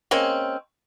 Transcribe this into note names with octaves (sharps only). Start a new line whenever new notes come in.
G#3 A#3 C4 C#4